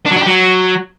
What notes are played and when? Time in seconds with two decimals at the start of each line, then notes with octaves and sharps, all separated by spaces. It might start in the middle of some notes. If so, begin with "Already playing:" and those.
0.06 D4
0.11 F#3
0.16 D4
0.21 G4
0.26 F#3